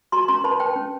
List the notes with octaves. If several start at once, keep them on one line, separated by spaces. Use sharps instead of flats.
F#4 A#5 C6
C#4 A#5 C6
B4 A5 B5
B4 G5 A5
C#4